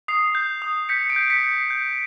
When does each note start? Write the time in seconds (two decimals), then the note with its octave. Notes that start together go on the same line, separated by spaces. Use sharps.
0.08 D#6 C7
0.35 G6
0.62 D#6
0.89 G6 B6 C#7
1.10 C7 D7
1.16 G6
1.30 B6 C#7
1.44 G6
1.50 C7
1.70 G6